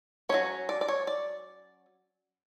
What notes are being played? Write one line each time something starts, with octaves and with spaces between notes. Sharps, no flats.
F#3 A3 C#4 C#5
D5
D5
C#5
D5